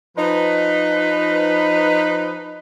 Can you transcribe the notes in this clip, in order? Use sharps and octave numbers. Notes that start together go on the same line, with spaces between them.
F3 D#4 B4